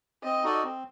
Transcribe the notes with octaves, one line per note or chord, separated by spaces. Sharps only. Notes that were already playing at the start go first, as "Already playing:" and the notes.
C4 D#5
D#4 F#4 A4 D5
C4